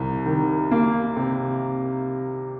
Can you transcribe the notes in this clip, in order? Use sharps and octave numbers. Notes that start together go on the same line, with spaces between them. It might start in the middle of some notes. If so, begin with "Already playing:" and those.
Already playing: C2 C3
D#3
A#3
C3